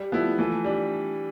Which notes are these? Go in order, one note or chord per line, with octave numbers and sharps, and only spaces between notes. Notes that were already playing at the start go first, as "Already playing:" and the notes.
Already playing: G3
F3 A3 B3 E4
E3 F3 A3
G3 D4